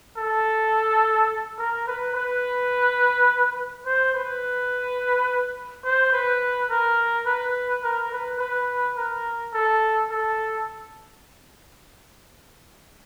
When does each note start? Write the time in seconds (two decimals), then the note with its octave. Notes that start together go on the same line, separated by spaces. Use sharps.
0.17 A4
1.59 A#4
1.88 B4
2.15 B4
3.86 C5
4.14 B4
5.85 C5
6.12 B4
6.70 A#4
7.26 B4
7.83 A#4
8.12 B4
8.39 B4
8.97 A#4
9.53 A4
10.10 A4